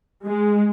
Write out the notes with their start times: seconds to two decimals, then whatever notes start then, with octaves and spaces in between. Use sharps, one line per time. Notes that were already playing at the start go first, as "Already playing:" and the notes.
0.26 G#3